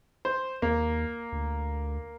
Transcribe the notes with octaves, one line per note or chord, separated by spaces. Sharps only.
C5
D#2 A#3
D2